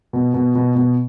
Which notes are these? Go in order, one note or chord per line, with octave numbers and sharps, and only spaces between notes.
B2
B2
B2
B2